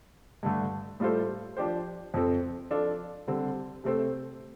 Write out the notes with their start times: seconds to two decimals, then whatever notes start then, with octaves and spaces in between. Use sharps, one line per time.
0.43 G2 D3 A3
1.00 A2 G3 F4 A4 C5
1.57 F3 D4 G4 C5
2.14 F2 F3 C4 A4
2.70 F3 D4 F4 A4
3.28 D3 G3 C4
3.84 C3 A3 C4 A4 C5